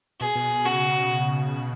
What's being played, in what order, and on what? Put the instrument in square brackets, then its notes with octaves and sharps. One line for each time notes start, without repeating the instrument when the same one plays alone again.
[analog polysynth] B2 [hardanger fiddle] G#4
[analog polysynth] B2
B2
[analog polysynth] C#3 [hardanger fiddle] F#4